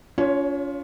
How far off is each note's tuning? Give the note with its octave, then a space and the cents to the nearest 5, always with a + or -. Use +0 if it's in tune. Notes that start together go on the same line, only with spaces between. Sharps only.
C#4 +40 F4 +0 C#5 +0